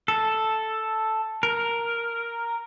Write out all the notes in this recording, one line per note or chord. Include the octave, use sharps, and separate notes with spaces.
A4
A#4